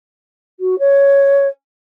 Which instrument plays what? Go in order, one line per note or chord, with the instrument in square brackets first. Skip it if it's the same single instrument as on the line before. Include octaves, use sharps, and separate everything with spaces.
[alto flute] F#4
C#5